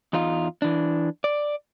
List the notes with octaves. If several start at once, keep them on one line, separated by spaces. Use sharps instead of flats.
E2 D#4 F4
E3 D4
D5